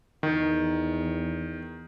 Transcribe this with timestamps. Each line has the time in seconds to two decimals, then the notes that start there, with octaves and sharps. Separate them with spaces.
0.23 E2 D#3